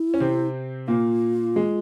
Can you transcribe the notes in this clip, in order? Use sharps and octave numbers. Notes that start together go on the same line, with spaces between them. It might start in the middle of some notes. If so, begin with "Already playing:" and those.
Already playing: E4
C#4
C3 C4
A#2 A#3 F4
G#3